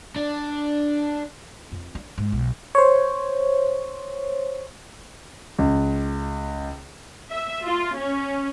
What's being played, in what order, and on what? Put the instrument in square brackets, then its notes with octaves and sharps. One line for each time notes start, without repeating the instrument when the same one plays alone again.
[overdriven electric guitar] D4
[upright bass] F2
D4
G#2
B1
[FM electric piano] C5 C#5
[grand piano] C#2
[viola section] E5
F4
C#4